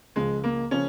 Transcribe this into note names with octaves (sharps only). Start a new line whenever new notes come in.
C#2 C#3 F3 G#3
A#3
C#3 F3 A#3 C#4